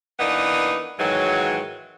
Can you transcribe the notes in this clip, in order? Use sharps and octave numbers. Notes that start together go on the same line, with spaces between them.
E3 A#3 B3 D4 D#4
G#2 D#3 E3 F#3